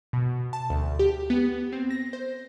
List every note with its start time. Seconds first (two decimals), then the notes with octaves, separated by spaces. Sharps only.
0.13 B2
0.53 A5
0.70 D2
0.99 G4
1.30 B3
1.72 C4
1.91 A#6
2.13 C5